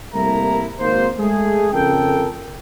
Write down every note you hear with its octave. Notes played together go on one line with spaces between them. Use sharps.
C2 G3 A3 A#3 E4 A#5
G#1 A#3 C5
G#3 A3 G#4
F2 C#3 A4 A#4 G5